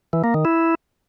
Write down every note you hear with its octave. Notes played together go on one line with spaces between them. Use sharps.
E3
A#3
D#3
E4